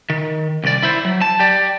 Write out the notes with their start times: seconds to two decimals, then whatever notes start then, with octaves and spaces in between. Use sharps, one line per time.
0.10 D#3
0.64 C2 D5
0.83 E4 C5
1.05 F#3
1.21 A5
1.40 G4 D5